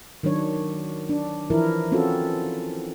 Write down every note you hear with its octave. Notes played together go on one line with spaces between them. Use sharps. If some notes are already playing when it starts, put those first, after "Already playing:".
D#3 F#3 D4 C#5
D4
E3 F3 E4 A#4
C4 C#4 F4 F#4 A4